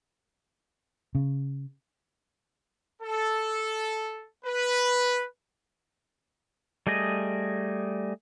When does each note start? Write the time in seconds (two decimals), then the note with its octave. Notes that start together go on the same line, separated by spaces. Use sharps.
1.15 C#3
3.02 A4
4.45 B4
6.87 G3 A3 G#4 D#5